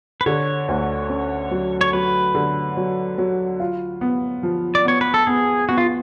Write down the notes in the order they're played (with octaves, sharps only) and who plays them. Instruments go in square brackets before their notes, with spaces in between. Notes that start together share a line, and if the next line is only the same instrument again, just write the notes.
[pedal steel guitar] B4
[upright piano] D3 [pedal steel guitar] C#5
[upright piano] D2
C#4
F#3
[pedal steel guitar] C#5
[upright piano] F#3 [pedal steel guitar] B4
[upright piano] D3
F#3
F#3
F4
B3
F3
[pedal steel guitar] D5
[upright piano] B3 [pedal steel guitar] C#5
[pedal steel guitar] B4
A4
[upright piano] B3 [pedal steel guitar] G#4
[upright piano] B3 [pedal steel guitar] F#4
[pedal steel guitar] F4